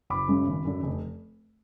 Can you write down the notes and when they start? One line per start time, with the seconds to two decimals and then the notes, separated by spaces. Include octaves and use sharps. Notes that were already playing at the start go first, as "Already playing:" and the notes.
0.10 F#1 B5 D6
0.28 F#2 C#3 G#3
0.47 G#1
0.65 F#2 D3
0.83 F1